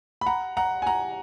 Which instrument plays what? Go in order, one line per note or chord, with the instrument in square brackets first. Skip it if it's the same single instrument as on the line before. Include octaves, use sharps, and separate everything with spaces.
[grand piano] B5
F#5 A#5
F#5 A#5
G#5
F#5 A#5